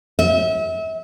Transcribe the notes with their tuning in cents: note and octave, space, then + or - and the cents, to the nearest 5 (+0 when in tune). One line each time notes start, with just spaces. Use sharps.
E5 -35